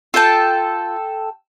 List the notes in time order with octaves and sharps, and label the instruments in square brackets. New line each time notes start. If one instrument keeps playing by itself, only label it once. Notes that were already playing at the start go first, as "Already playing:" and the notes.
[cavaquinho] F4 A5 [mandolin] A4 G5